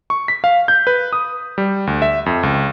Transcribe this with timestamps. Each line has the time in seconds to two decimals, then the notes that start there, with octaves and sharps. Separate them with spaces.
0.10 C#6
0.28 B6
0.44 F5
0.68 G6
0.87 B4
1.13 D#6
1.58 G3
1.87 D2
2.02 E5
2.26 F2
2.43 C#2